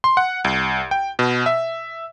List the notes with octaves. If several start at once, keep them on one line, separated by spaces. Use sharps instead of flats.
C6
F#5
C2
G5
B2
E5